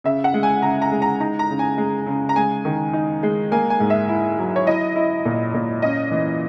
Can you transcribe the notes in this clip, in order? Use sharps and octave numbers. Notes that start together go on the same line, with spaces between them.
C#3 E5
F#5
G#3
G#5
C#3 A#5
A#5
G#3
A#5
D#4 A#5
A#5
C#3
G#5
G#3
C#3
A#5
G#3 G#5
D#3
D#4
G#3
A#3 G#5
G#5
G#2
E5
E4
F#3
C#5
E4 D#5
E4
A#2
A#2
C#4 D#5
E3